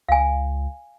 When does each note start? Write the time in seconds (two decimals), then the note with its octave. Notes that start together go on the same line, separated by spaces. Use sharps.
0.09 C#2 F5 G#5